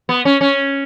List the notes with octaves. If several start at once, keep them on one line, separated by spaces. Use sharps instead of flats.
B3
C#4
C#4